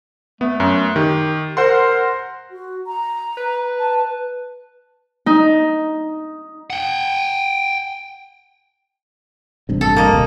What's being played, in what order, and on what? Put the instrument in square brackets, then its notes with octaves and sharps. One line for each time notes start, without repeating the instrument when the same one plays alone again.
[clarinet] A3 [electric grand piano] B3
[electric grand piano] F#2
[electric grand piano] D#3 [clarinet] G4
[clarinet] A#4 [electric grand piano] C5 F#5 C6
[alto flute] F#4
A#5
[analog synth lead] B4
[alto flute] A5
[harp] D#4
[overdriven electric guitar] F#5 G5
[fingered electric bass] A1 G2 C3
[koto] A4
A#3 D#5
[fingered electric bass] D#1 D#2 C3